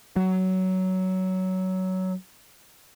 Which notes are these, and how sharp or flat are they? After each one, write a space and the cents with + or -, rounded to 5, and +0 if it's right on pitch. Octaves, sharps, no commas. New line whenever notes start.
F#3 +15